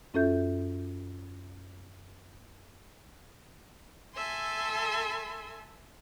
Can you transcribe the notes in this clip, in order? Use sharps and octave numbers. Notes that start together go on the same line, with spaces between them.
F#2 C#4 F4 A4 E5 G6
A4 E5 G#5 C6